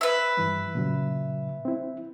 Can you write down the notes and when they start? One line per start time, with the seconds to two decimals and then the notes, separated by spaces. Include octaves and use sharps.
0.01 B4 E5
0.37 G2 E3 G3
0.75 A#2 C#3 F#3
1.65 C4 E4